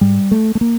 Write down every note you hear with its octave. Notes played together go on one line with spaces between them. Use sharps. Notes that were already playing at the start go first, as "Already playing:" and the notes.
G#2 G3
A3
A3
A#3